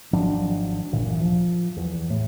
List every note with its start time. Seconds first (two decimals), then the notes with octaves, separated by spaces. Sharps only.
0.13 G#1 F3 F#3 D4
0.92 G1 D2 A#2 E3
1.20 F3
1.77 E2
2.10 A2